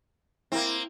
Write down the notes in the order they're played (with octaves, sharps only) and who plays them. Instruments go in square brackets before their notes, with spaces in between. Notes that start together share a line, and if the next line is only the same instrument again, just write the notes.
[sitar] A#3 C4 [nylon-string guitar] E4